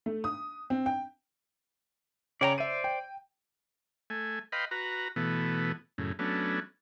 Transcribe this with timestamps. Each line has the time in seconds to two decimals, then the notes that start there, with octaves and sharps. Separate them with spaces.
0.06 A3
0.24 D#6
0.70 C4
0.86 G5
2.41 C#3 C#5 D5 G5 A#5
2.58 C5 D5 E5 D#7
2.84 G5
4.10 A3 G#5
4.52 B4 D#5 F5 G5 B5 C6
4.71 F#4 B4 A#5
5.16 B2 E3 A3 B3
5.98 F#2 A2 C#3
6.19 F#3 A3 B3 C#4 D4